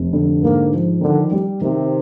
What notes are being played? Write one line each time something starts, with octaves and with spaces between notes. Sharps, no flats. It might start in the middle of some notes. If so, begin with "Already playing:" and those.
Already playing: F1
D3
G#2 A#3
F3
D3 D#3
G3
C3 D#3